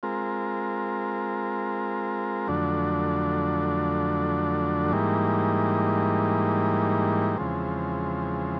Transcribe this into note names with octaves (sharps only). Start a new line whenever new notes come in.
G#3 C4 F4 A#4
F2 D3 F#3 A3 D4
G#2 E3 G3 A#3 D#4
E2 C#3 F3 G#3 C4